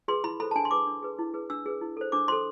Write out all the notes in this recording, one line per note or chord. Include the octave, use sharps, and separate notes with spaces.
G#4 B4 C6
E4 B5
A4 C5 B5
A5
D4 G#5
C6
G#4 B4 D6
D4
G#4 B4
E4
G#4 B4
D4 E6
G#4 B4
E4
A4 C5
D4 D6
A4 C5 C6